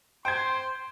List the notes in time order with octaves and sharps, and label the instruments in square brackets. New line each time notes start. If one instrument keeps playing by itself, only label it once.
[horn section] C5 C6 [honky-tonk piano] G5 G#6